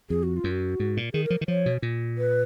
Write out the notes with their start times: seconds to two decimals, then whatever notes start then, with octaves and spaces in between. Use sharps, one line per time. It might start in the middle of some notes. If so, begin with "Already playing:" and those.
0.10 F2 G#4
0.23 F#4
0.37 F4
0.44 F#2
0.51 F#4
0.80 G#2
0.97 A#2
1.13 D#3 G#4
1.25 A#4
1.30 F3
1.41 D#3
1.48 F3 C#5
1.66 B2
1.82 A#2
2.18 B4